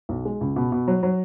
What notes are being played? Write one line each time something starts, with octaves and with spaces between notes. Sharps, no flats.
B1
G#3
C#2
B2
B2
F#3
F#3